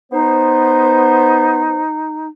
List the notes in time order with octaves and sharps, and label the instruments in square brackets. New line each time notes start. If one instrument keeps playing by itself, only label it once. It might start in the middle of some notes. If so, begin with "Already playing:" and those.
[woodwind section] B3 C5 [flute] D#4